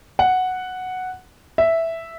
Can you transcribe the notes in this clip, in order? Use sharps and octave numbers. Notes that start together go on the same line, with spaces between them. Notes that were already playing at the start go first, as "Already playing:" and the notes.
F#5
E5